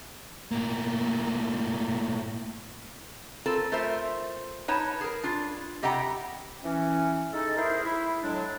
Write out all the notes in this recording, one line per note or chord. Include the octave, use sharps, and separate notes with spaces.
A2 A#3
C4 F4 A4 A#4
A3 F4 A#4 C5 E5
D#4 B4 C#5 F#5 A5
G#4 A#4
D4 F4
C3 G4 D#5 F#5 G5 A#5
E3 C#4
G#3 D#4 A4
E4 G#4 A#4 C5
E4
A2 F#3 G#3 D4